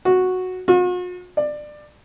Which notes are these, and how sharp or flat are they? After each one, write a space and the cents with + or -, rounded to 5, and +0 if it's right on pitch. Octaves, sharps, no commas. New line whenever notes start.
F#4 -5
F#4 -45
D5 +20